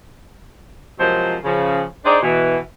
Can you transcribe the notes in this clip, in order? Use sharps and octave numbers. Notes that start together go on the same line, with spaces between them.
C3 F3 F#3 G#3 A#4 C5
C#3 F3
D4 D#4 G#4 C5 D5 D#5
B2 E3